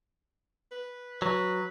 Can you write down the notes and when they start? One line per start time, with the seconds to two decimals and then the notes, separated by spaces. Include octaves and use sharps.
0.71 B4
1.22 F#3 B4